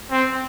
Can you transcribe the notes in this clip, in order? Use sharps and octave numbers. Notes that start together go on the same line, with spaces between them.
C4